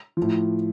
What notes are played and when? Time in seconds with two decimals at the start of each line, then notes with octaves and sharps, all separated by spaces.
0.17 F3
0.22 A2